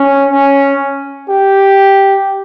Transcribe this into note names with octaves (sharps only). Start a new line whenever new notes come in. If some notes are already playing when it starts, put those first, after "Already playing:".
Already playing: C#4
C#4
G4